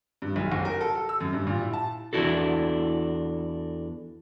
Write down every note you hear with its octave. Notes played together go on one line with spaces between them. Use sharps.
G2
B1
F#1
A#4
A4
A4
E6
F#2
G2
A#2
E4
A5
E2 D#3 D4 E4 F#4 A4